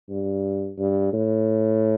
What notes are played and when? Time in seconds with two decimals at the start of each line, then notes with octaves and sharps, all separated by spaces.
0.09 G2
0.78 G2
1.13 A2